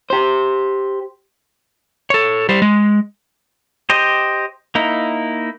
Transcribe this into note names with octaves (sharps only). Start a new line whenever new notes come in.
G4 C5
A4 C#5
G3 C5
G#3
G4 C5 D#5
A#3 D#4 E4